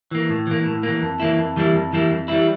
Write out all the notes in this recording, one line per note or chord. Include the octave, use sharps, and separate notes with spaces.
E3 A#3
A2
E3 A#3
A2
E3 A#3
F2
E3 G3 A#3 E4
F2
E3 G3 A#3 E4
F2
E3 G3 A#3 E4
F2
E3 G3 A#3 E4